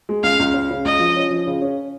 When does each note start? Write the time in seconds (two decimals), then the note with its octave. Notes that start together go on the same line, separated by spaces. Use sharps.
0.09 G#3
0.23 C#2 F5
0.39 C#2
0.54 C#3
0.70 C#3
0.85 C#2 D#5
1.00 F3
1.16 C#4
1.31 F3
1.47 C#3
1.62 C#4